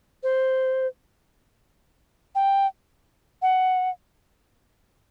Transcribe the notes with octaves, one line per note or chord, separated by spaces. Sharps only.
C5
G5
F#5